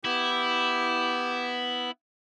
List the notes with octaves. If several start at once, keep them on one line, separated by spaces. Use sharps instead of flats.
B3 E4 G4